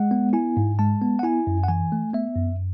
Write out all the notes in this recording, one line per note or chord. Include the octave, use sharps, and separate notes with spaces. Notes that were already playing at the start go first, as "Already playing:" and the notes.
Already playing: G#3 F#5
B3
E4 G#5
G#2
G#3 A5
B3
F#5
E4 G#5
F#2
F#5
E3 G#5
A3
B3 E5
F#2